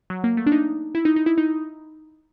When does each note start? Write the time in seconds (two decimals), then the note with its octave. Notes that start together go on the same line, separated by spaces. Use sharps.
0.10 F#3
0.24 A#3
0.37 A3
0.46 D4
0.52 D#4
0.95 E4
1.05 D#4
1.16 D#4
1.26 E4
1.38 D#4